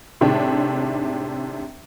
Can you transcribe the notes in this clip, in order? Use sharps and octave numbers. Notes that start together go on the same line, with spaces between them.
A2 C3 D#3 G#3 D4